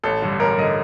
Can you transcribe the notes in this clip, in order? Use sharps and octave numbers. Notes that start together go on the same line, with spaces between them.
A1 A4
G2 D3
A1 A#4
G2 D3 D#5